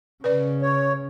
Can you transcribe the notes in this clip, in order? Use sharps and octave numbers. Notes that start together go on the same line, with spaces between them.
C#3 B4 D5
C#5